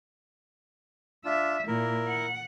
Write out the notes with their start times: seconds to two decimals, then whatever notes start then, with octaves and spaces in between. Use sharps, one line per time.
1.25 D4 F4 E5
1.68 A#2 E4 A#4
2.08 F#5